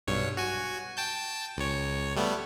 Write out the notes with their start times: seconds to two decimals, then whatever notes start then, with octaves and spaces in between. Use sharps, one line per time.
0.07 B1 G2 C#5
0.37 F#4 G#5
0.97 G5 A5 G6
1.57 C#2 C#5
2.16 G3 A3 B3